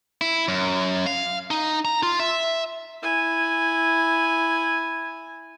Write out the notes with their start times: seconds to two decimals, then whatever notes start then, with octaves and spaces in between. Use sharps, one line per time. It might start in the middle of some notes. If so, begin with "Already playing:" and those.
0.21 E4
0.48 F#2
1.06 F5
1.51 D#4
1.85 A#5
2.03 F4
2.20 E5
3.03 E4 G#5